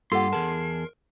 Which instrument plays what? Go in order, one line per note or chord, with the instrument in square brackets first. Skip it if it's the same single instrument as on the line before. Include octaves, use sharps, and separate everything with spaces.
[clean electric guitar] G2 [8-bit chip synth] A#3 F4 G4 [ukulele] A4 F#5 [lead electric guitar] C6
[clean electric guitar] E2 G#4 A5 [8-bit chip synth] A#4